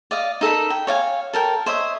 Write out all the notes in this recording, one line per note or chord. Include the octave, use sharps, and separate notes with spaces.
D5 D#5 F5
D#4 A4 A#4 B5
G5
C#5 D5 F5 G#5
A4 A#4 G5
C5 C#5 D#5 E5